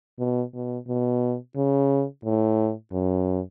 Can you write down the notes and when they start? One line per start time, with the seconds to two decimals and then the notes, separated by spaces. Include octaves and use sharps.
0.19 B2
0.54 B2
0.88 B2
1.56 C#3
2.24 A2
2.92 F#2